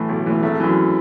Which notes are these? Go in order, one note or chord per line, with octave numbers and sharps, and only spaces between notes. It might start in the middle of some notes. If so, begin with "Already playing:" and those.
Already playing: A2 E3 A3
B1
A2 E3
G#1 A3
F#2 E3